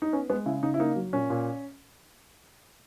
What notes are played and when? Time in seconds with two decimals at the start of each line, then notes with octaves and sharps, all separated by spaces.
0.02 D#4
0.13 B3 C#4
0.30 G#3 B3
0.46 C#3 E4
0.63 C#3 D#4
0.74 E4
0.79 A#3 D#4
0.96 F#3
1.13 A#2 C#4
1.30 A#2